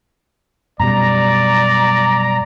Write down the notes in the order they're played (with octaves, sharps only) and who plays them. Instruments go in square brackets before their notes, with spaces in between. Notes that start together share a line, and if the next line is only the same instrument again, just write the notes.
[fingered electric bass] F#2 B2 G3 [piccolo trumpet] D5 [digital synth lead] A#5